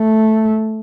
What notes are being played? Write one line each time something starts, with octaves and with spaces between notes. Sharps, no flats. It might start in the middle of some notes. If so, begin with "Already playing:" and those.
Already playing: A3